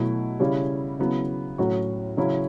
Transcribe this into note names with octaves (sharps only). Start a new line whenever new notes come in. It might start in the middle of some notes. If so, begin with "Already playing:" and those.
Already playing: B2 F#3 A3 E4
C#3 G3 C#4 E4
C#3 F#3 B3 E4
A2 F#3 C#4 F#4
C#3 F#3 C#4 E4